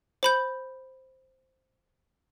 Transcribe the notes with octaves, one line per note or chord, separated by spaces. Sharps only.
C5 B5 G6